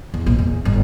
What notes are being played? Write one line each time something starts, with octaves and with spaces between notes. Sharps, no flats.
E2
A#1
E2
G1